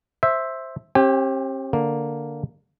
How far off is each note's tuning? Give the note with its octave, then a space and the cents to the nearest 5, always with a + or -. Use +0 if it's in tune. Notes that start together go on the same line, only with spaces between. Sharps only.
C5 +10 E5 +0
C4 +45 G4 +0 G#5 -45
D3 +0 A#3 +0